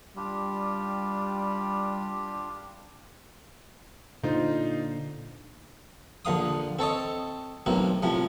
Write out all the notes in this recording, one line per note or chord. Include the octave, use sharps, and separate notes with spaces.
G3 D4 F4 G4
A#2 D3 D#4 F4 C5
A#1 D3 F5 D#6
C4 A4 C#5 D#5
B1 A2 A#3 C4
A2 C3 F3